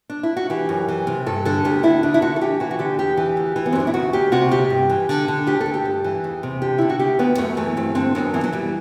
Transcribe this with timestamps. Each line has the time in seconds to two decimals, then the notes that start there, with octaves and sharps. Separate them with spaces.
0.10 D4
0.23 E4
0.37 F#4
0.50 E3 G4
0.69 F#2
0.88 E3
1.07 C3
1.26 G2 A4
1.45 D3 A4
1.65 D2 G4
1.83 D3 E4
2.03 D2 D4
2.14 E4
2.22 D3 F#4
2.36 A4
2.41 E3 G4
2.60 E3 F#4
2.71 F#4
2.79 D3 G4
2.99 E2 G4
3.17 E3
3.37 D2
3.56 E3
3.66 B3
3.73 C4
3.75 F#2 D4
3.87 E4
3.94 D2 F#4
4.13 D2 G4
4.32 C3 F#4
4.51 D2 G4
4.70 G2
4.90 E3
5.09 D3
5.28 D3
5.47 D2 G4
5.61 A4
5.66 D2
5.74 G4
5.85 G2
6.04 E3
6.24 E2
6.43 C3
6.62 D3 G4
6.78 D3 E4
6.90 F#4
6.99 D2 G4
7.19 D2 B3
7.38 F#2 A3
7.57 E3 A3
7.77 G2 C4
7.95 D3 C4
8.15 F#2 B3
8.34 E3 B3
8.44 F#3
8.53 E3 G3